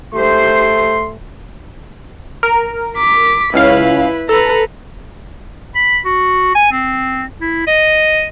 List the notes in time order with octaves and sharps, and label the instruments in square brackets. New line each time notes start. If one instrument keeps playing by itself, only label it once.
[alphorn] A3 [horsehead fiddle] G4 C5 [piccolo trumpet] C6
[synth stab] A#4
[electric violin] D6 B6
[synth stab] C#2 C#4 F5 [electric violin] E4 B4
[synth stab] A4 [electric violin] B4 A#5
[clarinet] B5
F#4
G#5
C4
E4
D#5